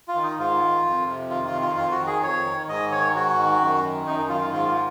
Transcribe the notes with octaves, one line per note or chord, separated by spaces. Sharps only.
F4
D#3
D#4
G#2 F4
D#3
F2
C3
D#3 F4
F4
F2
F4
F2 F4
F#4
D#3
G#4
F2 C#5
D#3
G#2 D#5
D#3 C#5
G#2 F#4
D#3
F#2
D#3
F#2 D#4
D#4
D#3 F4
F4
G#2 F4
F4